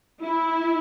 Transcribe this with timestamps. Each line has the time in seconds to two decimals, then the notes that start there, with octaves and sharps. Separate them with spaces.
0.24 E4